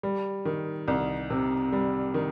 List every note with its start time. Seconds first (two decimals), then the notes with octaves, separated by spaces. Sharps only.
0.03 G3
0.45 D#3
0.88 C2
1.30 C3
1.72 G3
2.14 D#3